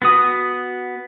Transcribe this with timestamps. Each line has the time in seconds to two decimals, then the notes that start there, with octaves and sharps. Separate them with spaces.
0.02 B3 F#4 D#6